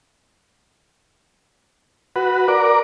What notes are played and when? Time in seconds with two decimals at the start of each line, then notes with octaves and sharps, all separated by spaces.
2.16 F#4 B4
2.48 A#4 D5